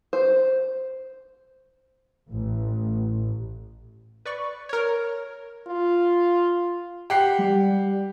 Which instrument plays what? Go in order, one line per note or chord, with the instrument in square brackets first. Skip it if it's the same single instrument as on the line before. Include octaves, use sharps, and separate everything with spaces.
[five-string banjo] C5
[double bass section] A1
[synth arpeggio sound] B4 D5 C#6
A#4 C#5
[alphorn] F4
[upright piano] G4 F#5 C7
[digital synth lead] G3